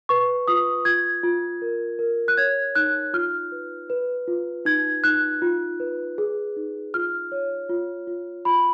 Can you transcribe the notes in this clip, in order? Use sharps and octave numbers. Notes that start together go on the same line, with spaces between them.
B4 C#6
F4 D#6
F4 G#6
F4
A#4
A#4
F#6
C#5 G#6
D#4 F#6
F4 F6
B4
B4
F4
D#4 G#6
D#4 F#6
F4
B4
G#4
D#4
F4 F6
C#5
F4
F4
F4 B5